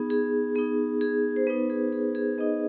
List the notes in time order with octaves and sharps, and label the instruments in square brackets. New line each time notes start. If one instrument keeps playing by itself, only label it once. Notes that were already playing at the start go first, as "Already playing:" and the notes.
Already playing: [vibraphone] B3 D#4 G#4
G#4
B3 D#4 G#4
G#4
C5
B3 D#4 B4
G#4
G#4
G#4
B3 D#4 D#5